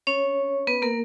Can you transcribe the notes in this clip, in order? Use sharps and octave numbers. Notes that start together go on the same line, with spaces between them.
C#4 C#5
B3 B4
A#3 A#4